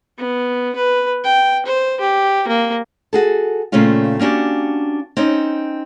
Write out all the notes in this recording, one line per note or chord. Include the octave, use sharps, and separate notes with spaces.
B3
B4
G5
C5
G4
A#3
F#4 G#4 A4
A#2 C#3 A3 C4 C#4 F4
A#3 C#4 D4 F#4 G4
C4 C#4 D#4